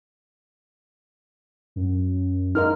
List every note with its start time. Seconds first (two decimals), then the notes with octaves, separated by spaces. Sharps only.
1.76 F#2
2.55 D#4 A#4 D#5 F6